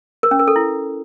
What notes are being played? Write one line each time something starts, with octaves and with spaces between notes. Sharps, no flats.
A#4
C#4
A#4
A4
E4